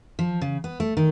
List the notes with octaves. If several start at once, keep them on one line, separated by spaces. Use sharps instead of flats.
F3
C#3
B3
A3
D#3